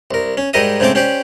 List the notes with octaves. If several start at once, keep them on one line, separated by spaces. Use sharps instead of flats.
C2 A#4
C#4
G#2 G3 A#4 D#5 E5 D#6
G#2 C#3 A3 C4 A5 D6
C#4 G4 C5 D5